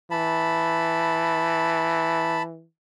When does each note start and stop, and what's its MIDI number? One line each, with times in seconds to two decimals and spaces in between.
0.11 2.65 52
0.11 2.42 81
0.11 2.42 83